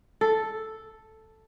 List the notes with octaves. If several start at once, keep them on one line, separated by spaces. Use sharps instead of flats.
A4